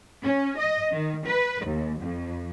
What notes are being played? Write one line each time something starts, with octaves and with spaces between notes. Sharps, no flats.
C#4
D#5
D#3
B4
D#2
F2